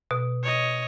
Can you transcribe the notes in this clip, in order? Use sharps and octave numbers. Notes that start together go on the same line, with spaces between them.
B2
C#5 D#5